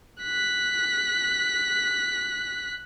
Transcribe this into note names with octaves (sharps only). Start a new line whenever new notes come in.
F#6 B6